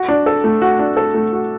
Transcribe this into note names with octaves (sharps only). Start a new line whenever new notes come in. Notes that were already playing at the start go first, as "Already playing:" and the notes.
Already playing: F#4
D4
A4
A3
F#4
D4
A4
A3
F#4